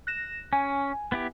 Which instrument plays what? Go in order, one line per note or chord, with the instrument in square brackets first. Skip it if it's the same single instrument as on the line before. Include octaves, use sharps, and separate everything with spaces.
[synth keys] F#6 A#6 E7
[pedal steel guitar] C#4 [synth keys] G#5
[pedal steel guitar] B3 E4 G4